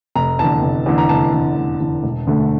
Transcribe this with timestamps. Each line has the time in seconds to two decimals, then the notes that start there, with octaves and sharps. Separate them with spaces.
0.15 F1 A#5
0.39 E2 D3 A5
0.62 F1
0.86 E2 D3
0.98 A#5
1.09 F1 A5
1.33 E2 D3
1.57 F1
1.80 E2 D3
2.03 E1
2.27 D2 D3 A3